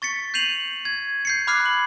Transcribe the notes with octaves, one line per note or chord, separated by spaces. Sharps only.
C#6 A6 B6 C#7
G6 C7 D#7 F7 F#7
G#6
G6 C7 C#7
B5 D6 F6 F#6 G#6 C7
F#7